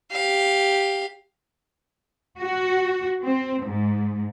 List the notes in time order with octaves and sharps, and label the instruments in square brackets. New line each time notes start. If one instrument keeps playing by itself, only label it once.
[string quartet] G4 F5
[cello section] F#4
C4
G#2